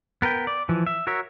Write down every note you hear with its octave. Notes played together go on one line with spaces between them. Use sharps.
B3 A#4 B4 G5
D5
E3 F3
E5
F#4 A#4 C#5 E5